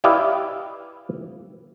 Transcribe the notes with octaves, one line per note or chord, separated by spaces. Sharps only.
E4 G4 B4 D5 D#5 F5